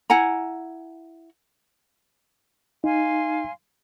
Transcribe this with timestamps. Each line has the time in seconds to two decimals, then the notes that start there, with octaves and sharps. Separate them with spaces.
0.10 E4 F#5 G#5 A#5
2.84 D#4 F5 G#5 C6